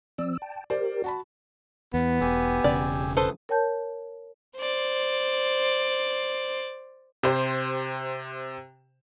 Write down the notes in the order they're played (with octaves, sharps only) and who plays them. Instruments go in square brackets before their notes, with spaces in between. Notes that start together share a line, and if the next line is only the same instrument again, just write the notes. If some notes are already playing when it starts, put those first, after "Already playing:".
[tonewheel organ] F3 C4 E6 [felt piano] D5
[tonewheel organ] G5 A5
[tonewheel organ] G4 A#4 [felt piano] C5 D5
[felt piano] F#4 A5 B5
[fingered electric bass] E2 [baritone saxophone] B3
[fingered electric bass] E1 [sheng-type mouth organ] G4 G#5 E6
[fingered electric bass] E1 C#3 [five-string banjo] D5
[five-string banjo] A4 B4 C5 [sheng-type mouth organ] D#6
[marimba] A#4 C#5 G5 A5 G6
[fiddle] C5 D5
[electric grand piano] C3 [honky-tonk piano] G4 C5